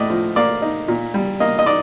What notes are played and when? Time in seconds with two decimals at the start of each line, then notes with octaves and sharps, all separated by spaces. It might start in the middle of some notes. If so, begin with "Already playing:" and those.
Already playing: A2 D5 D#5
0.10 F3
0.36 A#3 D5
0.62 D#4
0.88 A#2
1.14 G3
1.40 A#3 D#5
1.59 D#5
1.66 D#4 D5